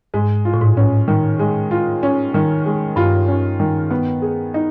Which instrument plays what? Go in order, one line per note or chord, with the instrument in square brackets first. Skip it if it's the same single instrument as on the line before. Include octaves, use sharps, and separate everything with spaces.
[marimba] G#2 [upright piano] G#3
[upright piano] F4
[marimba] A2
G#2
[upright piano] C#4
D#3
G#3
F4
C#4
D#3
G#3
[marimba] G2 [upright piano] F4
[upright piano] C#4
D#3
B3
G#4
D#4